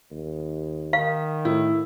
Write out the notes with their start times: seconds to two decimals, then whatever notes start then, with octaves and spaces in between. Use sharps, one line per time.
0.11 D#2
0.93 D#3 F5
1.45 A2 E4